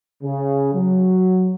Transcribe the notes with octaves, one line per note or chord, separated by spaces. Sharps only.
C#3
F#3